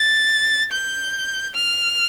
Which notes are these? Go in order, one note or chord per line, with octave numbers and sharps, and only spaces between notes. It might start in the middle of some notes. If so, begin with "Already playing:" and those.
Already playing: A6
G6
F6